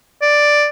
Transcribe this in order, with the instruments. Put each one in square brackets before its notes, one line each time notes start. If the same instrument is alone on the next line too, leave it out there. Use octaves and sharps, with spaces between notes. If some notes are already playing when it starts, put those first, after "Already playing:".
[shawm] D5